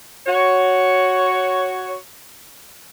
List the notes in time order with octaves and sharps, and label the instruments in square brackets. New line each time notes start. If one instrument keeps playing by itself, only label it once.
[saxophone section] F#4 C#5